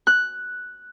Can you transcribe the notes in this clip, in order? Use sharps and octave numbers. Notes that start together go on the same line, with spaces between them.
F#6